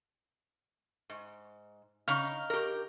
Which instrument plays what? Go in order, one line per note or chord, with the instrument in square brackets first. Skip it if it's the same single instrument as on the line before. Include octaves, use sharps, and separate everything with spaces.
[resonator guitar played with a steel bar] G#2
[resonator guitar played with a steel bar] C#3 [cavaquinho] D#4 F5
[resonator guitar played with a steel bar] G4 A#4